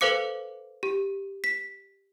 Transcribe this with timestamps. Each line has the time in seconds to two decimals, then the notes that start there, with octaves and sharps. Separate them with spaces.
0.01 A4 B4 C5 F5 D6 C#7
0.83 G4
1.44 B6